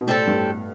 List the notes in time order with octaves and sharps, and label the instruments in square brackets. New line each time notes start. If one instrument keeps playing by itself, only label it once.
[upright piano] B2
[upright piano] A2 [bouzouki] G3 C4 E4 A4
[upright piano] G2
A2